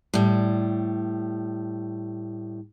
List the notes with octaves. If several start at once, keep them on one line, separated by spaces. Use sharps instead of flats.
A2 G3